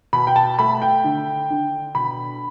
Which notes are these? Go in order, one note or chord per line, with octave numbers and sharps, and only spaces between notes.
B2 B5
G5
A5
A3 B5
G5
D3
D3
B2 B5